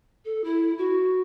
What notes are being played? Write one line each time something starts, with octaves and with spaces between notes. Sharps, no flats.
A4
E4
F#4